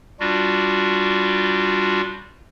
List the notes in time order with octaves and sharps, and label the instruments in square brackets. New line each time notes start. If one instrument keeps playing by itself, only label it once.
[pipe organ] G3 D4 F4 F#4